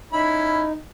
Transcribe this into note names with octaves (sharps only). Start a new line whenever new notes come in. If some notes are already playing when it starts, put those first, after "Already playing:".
C#4 D#4 E4 B5